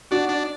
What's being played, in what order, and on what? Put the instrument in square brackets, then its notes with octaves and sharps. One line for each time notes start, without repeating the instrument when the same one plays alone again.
[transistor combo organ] D4 [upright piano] F#4
[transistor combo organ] D4